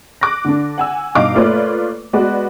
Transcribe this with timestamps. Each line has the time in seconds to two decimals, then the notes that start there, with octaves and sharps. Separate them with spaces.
0.21 D6 F#6 A#6
0.45 D3 D4
0.78 F#5 G#5 E6
1.15 G2 B2 D#4 F5 D6
1.35 A3 A#3 F4 B4 C#5 D5
2.13 G#3 B3 F#4 B4 D5